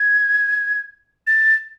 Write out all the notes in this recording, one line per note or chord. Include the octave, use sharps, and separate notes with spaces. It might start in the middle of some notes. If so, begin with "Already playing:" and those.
Already playing: G#6
A6